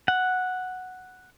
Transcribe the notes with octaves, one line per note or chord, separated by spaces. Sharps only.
F#5